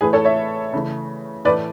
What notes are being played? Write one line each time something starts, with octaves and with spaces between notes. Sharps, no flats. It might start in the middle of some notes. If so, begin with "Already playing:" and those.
A2 E3 A3 G#4 B4
A4 C#5
C#5 E5
C#3 E3 A3
A2 E3 A3 B4 D5